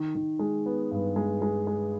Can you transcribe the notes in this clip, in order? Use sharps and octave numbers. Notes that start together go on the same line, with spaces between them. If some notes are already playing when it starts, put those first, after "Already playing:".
Already playing: D#3
D#3
G#3
B3
G2
G#3
G#3
G#3